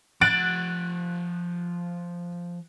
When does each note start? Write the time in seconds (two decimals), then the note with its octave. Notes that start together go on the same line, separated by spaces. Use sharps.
0.21 F3 F#5 F#6 A6 D7